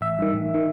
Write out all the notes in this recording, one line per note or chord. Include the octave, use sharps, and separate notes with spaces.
A1 E5
G2 D#3
A1
D#3